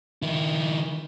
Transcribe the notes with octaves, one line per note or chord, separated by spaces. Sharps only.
D#3 E4